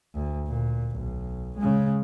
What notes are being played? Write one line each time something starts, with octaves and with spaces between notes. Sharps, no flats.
D2
A#2
B1
C#3 G#3